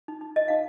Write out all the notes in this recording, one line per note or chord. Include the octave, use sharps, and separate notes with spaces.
D#4
D#4
A#4 D#5
D#4 F5